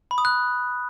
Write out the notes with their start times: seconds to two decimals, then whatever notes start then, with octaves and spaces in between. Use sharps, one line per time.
0.11 B5
0.18 D#6
0.25 F#6